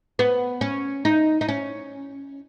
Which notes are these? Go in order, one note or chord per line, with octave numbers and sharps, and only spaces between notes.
B3
C#4
D#4
D#4
C#4